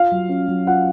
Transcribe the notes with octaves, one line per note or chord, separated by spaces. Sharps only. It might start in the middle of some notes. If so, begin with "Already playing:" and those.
Already playing: F4 F5
F#3
C#4
F#3
F4 F#5